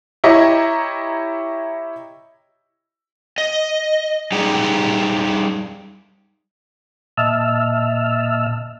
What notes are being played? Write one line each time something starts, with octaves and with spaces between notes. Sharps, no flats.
E4 G4 C#5 D#5 E5 A#5
D#5
G3 D#4 G4 G#4
A#2 D#5 E5 A5 E6 F6